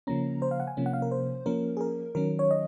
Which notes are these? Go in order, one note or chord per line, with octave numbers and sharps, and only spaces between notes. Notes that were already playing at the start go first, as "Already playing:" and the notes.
C#3 F3 A#3 C#4 A#5
C5
F5
F#5
G#5
C3 F3 A#3 C#4
F#5
F5
A#4
C5
F3 A#3 C#4 A#4
G#4
A#4
D#3 F#3 C#4 A#4
C#5
D#5